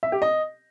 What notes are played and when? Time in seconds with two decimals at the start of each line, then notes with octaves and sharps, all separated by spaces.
0.03 E5
0.12 G4
0.22 D#5